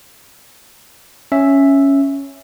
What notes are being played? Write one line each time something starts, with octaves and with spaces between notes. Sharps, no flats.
C#4 E5